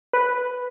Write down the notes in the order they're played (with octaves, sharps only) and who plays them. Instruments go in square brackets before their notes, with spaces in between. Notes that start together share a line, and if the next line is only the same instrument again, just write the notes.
[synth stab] B4